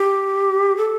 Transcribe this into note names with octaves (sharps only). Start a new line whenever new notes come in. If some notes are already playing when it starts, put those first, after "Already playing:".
Already playing: G4
A4